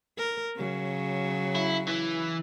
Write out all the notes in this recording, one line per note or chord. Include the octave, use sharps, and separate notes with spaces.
A#4
C#3 F#3
E4
E3